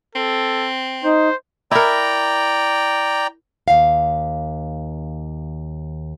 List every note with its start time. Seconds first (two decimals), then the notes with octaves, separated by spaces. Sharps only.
0.15 C4 A4
1.04 D#4 C5
1.71 E4 A#4 D5 G5 A#5
3.68 D#2 F5